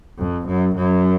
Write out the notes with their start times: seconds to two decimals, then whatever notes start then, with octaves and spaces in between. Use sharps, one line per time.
0.18 F2
0.47 F#2
0.75 F#2